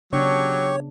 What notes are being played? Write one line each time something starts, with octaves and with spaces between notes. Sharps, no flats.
C#3 F#3 B3 D4 G4 C#5 C#6